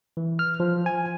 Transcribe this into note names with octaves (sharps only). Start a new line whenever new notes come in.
E3
F6
F3
G#5